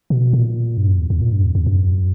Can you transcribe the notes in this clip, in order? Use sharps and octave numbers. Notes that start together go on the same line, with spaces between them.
B2
A#2
G2
F#2
E2
E2
A#2
G2
E2
E2
F#2